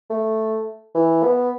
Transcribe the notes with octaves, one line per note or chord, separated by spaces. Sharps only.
A3
E3
B3